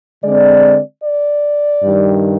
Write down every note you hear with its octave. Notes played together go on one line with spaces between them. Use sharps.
D3 G#3 C4 D5
D5
G2 D#3 G3